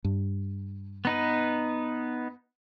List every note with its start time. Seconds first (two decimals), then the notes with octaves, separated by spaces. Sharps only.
0.04 G2
1.05 B3 D#4 B4